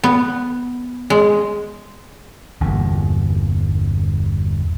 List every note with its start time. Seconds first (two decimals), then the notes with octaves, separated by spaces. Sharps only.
0.04 B3
1.10 G#3
2.60 G1 E2 G2 A#2